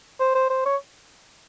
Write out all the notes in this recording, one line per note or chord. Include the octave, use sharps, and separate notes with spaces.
C5
C5
C5
C#5